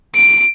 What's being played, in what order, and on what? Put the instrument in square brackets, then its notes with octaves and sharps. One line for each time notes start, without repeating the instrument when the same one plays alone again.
[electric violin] D7